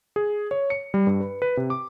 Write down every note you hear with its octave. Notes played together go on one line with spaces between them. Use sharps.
G#4
C#5
C#7
G3
G2
B4
B4
C3
D6